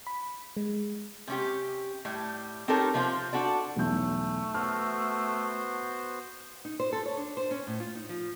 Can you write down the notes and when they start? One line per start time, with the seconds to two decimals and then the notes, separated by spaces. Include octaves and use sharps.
0.07 B5
0.57 G#3
1.28 C3 C#4 G4
2.05 A2 G3
2.68 C4 D#4 G4 A4 A#4 C#5
2.94 C3 F3 D4 F4 C5
3.33 D4 F#4 A4 D5
3.76 B1 E2 A3 G6
4.54 B3 F#4 C5 A5 F6
6.65 D#4
6.80 C5
6.93 A4
7.06 C#5
7.17 D4
7.37 C5
7.51 C#4
7.67 A2
7.80 F4
7.95 D#4
8.09 F3